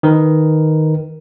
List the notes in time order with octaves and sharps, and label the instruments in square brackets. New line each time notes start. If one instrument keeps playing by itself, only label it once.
[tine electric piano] D#3 A#4 B4